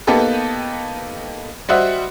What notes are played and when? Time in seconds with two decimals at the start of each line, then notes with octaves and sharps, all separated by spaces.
0.07 A#3 B3 D#4 G4 A4 B4
1.68 G3 F#4 C5 D#5 E5 F#5